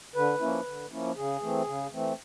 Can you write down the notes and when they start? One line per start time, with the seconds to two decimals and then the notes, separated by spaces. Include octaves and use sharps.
0.15 D3 B4
0.40 F3 A#3 C#4 E4
0.66 D3
0.91 F3 A#3 C#4 E4
1.16 C#3 G#4
1.42 E3 A3 C4
1.67 C#3
1.92 E3 A3 C4